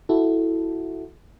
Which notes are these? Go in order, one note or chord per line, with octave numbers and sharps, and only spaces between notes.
E4 F#4 A4